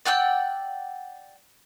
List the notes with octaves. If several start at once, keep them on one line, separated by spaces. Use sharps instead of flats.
D5 F#5 G5 E6